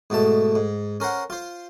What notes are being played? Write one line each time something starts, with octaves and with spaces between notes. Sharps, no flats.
G#2 B2 A3 A5
G#2
C#4 A#4 C5 F#5
F4 C5